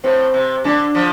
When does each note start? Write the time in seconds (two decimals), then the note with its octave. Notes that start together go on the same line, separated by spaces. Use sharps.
0.04 A2 C4
0.34 C3
0.64 D3 D4
0.95 D3 F3